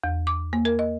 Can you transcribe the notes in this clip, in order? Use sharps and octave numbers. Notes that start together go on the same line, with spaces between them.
E2
D6
A#3
A#4
D#5